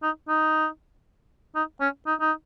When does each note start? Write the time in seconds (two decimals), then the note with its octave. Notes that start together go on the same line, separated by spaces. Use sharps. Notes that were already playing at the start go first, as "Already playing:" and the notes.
0.03 D#4
0.29 D#4
1.55 D#4
1.81 C#4
2.07 D#4
2.21 D#4